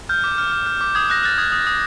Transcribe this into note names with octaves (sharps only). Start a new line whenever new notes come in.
F6 G6
D6
F6
F6
F6
D6
D#6 G#6
F#6 A#6
F#6 A6
D#6 G#6
D#6
D#6